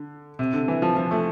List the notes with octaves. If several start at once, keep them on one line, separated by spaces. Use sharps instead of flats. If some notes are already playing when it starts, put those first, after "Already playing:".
Already playing: D3
C3
D3
E3
F3
F3
A3